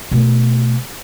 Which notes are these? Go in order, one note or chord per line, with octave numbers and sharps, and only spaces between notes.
B2 A3